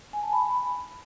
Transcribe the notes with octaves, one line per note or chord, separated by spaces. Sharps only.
G#5
A5
B5